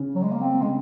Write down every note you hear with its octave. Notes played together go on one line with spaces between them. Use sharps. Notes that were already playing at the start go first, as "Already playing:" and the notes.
Already playing: C#3
F#3
G#3
A#3
C4
C#3 G#3